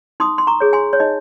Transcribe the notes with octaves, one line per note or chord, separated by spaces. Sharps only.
D#4 C6 D#6
C6
A#5 C#6
G#4 C#5
G#5 C6
C#5
D#4 D#5